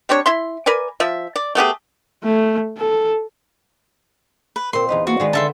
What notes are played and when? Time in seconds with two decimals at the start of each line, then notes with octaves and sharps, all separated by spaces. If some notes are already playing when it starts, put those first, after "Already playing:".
0.09 G3 C4 D4 C#5
0.26 E4 E5 C6
0.66 A#4 B4 D5 G#5
1.00 F3 E5
1.36 D5
1.55 A3 B3 G4 G#4
2.24 A3
2.78 A4
4.56 B4
4.73 A#2 C4 A#4 C6
4.89 E2 D#4 B4 D#5
5.07 A#3 F4 F#4
5.20 D#3 G#3 B4 D5
5.33 D3 B3 A4 E5 G5 C6